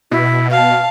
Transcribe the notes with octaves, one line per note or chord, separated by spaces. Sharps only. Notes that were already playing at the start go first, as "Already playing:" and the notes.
B2 E4
F5 A5 F6